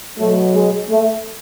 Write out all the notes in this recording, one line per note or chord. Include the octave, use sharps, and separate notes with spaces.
B2 F#3 A3
G#3
A3